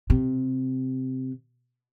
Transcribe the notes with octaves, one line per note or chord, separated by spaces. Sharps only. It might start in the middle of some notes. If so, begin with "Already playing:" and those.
C3